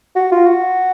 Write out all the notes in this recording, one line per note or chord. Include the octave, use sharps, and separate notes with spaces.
F#4
F4
F#4